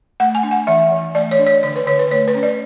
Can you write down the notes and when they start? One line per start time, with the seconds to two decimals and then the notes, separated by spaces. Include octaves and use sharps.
0.20 A3 F#5
0.35 G#5
0.43 D4
0.51 F#5
0.67 E3 E5
0.92 E3
1.15 A3 D5
1.31 C#5
1.39 D4
1.47 C#5
1.63 D3 C#5
1.76 B4
1.87 D3 C#5
1.99 B4
2.11 A3 C#5
2.28 B4
2.35 C#4
2.43 D5